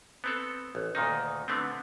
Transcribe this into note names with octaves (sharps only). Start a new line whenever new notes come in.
B3 C4 A4
A1
D2 A#2 D#3 D#4
D3 A3 B3 C4